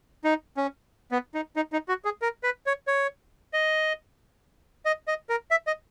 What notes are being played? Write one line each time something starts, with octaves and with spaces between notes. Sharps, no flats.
D#4
C#4
B3
D#4
D#4
D#4
F#4
G#4
A#4
B4
C#5
C#5
D#5
D#5
D#5
A#4
E5
D#5